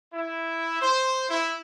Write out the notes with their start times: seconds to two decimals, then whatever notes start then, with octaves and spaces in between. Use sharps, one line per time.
0.13 E4
0.81 C5
1.29 E4